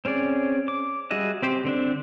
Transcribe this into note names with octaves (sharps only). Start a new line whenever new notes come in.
C4 C#4 G#4 D5
D6
G3 F#4 G#4 D#5 E5
C4 G4 C5
D3 C4 D4